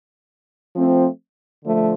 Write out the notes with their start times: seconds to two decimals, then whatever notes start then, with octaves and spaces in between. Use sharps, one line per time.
0.76 F3 A3 C4
1.64 D3 F3 A3